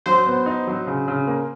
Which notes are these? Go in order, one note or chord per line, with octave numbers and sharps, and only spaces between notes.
F#3 C5
B3
D#4
F#3
C#3
C#3
A#3